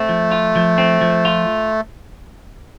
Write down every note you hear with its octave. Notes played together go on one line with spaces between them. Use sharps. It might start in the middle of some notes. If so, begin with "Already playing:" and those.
Already playing: A3 C4
F3
F4
F3
C4
F3
F4